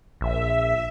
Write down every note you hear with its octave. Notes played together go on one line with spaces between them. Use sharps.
A#1 E5